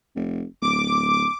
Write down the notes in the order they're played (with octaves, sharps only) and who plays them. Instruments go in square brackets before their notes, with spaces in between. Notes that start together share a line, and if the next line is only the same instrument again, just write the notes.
[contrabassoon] F1
[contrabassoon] D1 [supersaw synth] D6